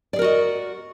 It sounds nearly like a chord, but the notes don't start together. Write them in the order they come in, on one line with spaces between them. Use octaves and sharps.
D5 G#4 A#4 F#4 D#5